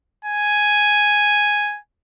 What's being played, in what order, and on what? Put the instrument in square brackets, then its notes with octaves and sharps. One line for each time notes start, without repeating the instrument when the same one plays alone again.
[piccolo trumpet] G#5